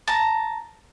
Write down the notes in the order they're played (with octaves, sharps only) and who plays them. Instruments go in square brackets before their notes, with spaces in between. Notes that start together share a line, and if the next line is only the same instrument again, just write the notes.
[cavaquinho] A5 A#5